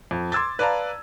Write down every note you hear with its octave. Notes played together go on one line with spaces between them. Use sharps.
F2
C6 D6 E6 G#6 A6
B4 D5 F5 A5 A#5